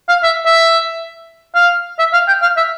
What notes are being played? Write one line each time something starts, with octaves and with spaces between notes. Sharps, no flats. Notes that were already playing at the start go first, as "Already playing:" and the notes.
F5
E5
E5
F5
E5
F5
G5
F5
E5